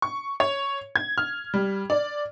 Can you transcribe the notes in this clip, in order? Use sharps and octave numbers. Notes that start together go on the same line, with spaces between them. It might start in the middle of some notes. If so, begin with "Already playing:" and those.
C#6
C#5
G#6
F6
G3
D5